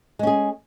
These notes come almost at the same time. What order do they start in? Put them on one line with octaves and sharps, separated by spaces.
G#3 C#4 G#4